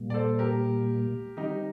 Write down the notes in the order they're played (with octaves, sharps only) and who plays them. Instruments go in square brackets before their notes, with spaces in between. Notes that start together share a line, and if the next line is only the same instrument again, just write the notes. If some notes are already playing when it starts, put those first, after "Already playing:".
Already playing: [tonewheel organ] A#2 G3 A#3
[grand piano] D5
A4 C5
G4 A#4
[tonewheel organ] D#3 G3 C4 [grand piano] D#4 G4